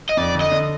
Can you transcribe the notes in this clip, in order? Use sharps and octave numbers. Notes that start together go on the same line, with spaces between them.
D#5
F2 D5
D3
D#5
D3